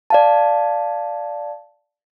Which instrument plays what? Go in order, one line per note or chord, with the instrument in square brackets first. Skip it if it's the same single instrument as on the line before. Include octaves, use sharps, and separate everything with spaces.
[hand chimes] D5 F5 A5